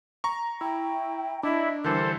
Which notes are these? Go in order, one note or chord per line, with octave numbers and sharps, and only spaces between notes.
A#5 C#6
E4 G5
D4 E4 D#5
D3 E3 G3 A4 A#4 C5